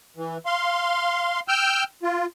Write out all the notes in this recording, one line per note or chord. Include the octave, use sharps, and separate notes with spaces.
E3
F5 C6
G5 E6 F6 G6
F4